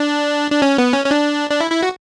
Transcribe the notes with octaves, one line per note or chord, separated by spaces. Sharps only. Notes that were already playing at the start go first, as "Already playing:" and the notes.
Already playing: D4
D4
C#4
B3
C#4
C#4
D4
D4
E4
E4
F#4